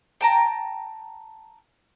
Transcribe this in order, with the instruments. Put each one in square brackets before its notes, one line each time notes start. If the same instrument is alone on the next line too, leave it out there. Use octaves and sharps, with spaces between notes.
[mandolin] G5 A5 A#5